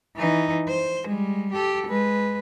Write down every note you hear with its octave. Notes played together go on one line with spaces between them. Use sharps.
E3 D#4
C5
G3 G#3
G4 A4
G#3 B4